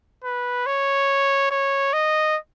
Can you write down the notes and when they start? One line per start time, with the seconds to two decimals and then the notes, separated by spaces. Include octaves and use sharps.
0.24 B4
0.67 C#5
1.51 C#5
1.93 D#5